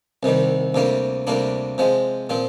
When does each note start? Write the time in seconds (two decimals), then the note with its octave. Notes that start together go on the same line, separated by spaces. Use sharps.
0.23 C2 C3 D#3 G3
0.74 D2 C3 G3 A#3
1.27 D2 C3 G3 A#3 D4
1.78 C3 F3 G#3
2.30 A#2 F3 C4